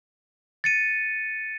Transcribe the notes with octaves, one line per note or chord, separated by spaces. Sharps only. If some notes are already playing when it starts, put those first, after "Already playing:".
A6 C#7 D#7